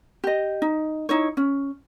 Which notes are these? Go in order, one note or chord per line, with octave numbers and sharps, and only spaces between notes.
G4 D#5
D#4
D#4 E4 C#5
C#4